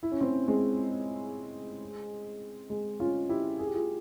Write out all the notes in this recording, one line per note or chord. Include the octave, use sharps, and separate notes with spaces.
E4
C#4
C4 E4
G#3 C4
G#3
C#4 F4
E4 G4
G#4
G4
F4 G#4